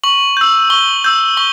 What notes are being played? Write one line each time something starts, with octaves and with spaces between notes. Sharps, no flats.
C#6 F#7
E6 G6
C#6 G7
E6 G6
C#6 G7